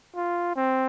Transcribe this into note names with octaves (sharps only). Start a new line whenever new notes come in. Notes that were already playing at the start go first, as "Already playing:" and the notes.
F4
C4